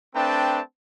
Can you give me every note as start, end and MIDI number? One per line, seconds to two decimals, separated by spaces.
0.16 0.61 57
0.16 0.61 60
0.16 0.61 62
0.16 0.61 71
0.16 0.61 79
0.16 0.61 81